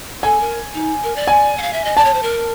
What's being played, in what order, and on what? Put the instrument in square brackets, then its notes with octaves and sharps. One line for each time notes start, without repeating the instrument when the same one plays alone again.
[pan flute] A4 [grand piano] G#5
[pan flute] A#4
D#4
A#4
D5
[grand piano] G#5
[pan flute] F#5
F5
E5
D#5
[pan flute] D5 [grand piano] A5
[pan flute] C#5
C5
A#4